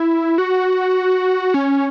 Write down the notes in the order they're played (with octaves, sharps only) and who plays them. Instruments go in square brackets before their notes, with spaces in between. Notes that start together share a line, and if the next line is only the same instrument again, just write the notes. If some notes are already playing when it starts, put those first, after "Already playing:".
Already playing: [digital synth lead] E4
F#4
C#4